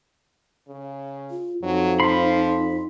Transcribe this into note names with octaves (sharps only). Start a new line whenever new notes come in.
C#3
F4
F2 F#3 D#4
F3 B5 C6